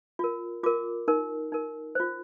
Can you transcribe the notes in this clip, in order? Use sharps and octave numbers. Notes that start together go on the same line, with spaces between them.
F4 A#4
F4 A#4 D6
D#4 A#4
D#4 A#4
F4 C5